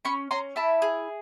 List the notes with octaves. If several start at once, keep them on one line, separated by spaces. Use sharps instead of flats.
C#4 B5 C#6
C#4 A#5 C6
E4 A5 B5
G#4